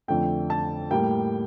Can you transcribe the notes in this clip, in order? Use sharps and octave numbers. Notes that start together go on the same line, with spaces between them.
F2 D3 A3 G5
A5
A2 G3 A#3 G5